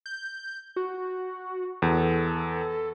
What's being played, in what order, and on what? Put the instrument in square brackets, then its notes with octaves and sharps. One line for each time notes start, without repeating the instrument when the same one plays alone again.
[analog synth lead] G6
F#4
[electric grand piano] E2 [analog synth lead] A4